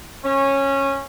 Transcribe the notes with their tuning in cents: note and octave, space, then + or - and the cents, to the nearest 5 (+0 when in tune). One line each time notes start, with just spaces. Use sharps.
C#4 -15